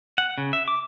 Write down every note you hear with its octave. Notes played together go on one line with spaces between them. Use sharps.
F#5
C#3
E5
D6